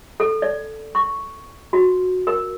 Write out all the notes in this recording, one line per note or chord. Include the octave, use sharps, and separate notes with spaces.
A4
D5
C#6
F#4
A#4